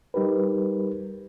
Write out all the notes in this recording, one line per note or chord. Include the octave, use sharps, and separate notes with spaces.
G3 D#4 G4 A#4 B4